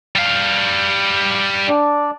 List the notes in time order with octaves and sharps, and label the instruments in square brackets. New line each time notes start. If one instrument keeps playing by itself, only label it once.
[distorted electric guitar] G3 F5
[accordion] D4 D5